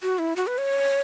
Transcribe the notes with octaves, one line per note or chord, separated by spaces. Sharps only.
F#4
E4
F#4
B4
C#5